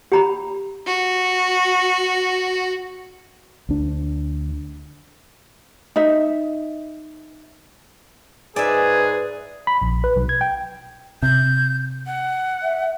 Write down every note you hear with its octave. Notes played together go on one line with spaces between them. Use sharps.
G4 A#5 B5
F#4
D2 D4
D#4 E5
G#2 G#4 B4 D5 E5 G#5
B5
A#1
B4
B1
G#6
G5
C3 G6
F#5
E5